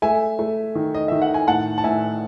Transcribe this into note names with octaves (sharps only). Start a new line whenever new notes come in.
A3 E5 G#5
A3
D#3
D#5
D#3 E5
F#5
G#5
A2 F#5 A5
A5
A2 E5 G#5